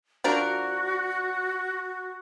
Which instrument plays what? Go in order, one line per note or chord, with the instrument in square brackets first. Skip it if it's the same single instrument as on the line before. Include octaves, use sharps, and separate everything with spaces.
[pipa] F3 D4 A#4 [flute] F#4